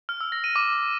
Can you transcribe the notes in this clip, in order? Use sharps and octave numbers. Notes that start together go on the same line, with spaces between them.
F6
E6
A#6
D#7
D6